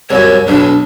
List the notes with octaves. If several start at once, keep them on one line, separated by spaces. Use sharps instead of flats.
C2 F#2 C#5
B1 D4